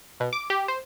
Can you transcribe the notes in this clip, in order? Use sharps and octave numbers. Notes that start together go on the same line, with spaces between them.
B2
D6
G4
C5